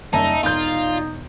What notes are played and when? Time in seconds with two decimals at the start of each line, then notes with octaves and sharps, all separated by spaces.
0.13 F#1 G3 D#4 E5 G#5 A5
0.43 E1 D#4 F4 D5 G#5 G6